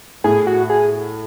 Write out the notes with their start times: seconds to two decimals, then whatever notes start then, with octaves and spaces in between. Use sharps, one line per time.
0.24 A2 G#4
0.47 F#4
0.70 G#4